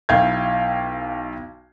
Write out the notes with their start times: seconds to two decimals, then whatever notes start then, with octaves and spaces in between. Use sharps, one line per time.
0.09 B1 E4 F5 G5 G6 G#6